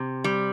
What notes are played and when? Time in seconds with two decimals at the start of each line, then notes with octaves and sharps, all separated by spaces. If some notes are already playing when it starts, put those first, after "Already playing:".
Already playing: C3
0.24 G3